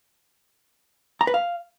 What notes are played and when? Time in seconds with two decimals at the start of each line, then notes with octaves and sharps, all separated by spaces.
1.21 A#5
1.27 B4
1.34 F5